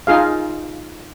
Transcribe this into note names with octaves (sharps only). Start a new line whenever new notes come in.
D#4 F4 G#4 F5